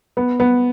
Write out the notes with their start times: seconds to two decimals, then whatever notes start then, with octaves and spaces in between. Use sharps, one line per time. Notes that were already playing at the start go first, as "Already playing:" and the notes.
0.17 B3
0.40 B3